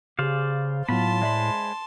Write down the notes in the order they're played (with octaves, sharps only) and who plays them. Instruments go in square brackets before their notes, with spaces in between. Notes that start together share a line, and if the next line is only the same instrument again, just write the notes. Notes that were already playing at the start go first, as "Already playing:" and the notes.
[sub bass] C#3 [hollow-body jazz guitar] G4 G#4 [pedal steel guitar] C5 D5 F5
[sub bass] A2 [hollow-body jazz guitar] F#3 B3 [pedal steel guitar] F4 B5 [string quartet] A5 C6
[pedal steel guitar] G#3 C5 B5 [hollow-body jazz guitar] D5 E5